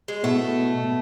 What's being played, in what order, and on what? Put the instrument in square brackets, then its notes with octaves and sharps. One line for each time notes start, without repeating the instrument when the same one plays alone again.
[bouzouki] G#3
[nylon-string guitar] B2 B3 E4 [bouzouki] A3
[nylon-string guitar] B2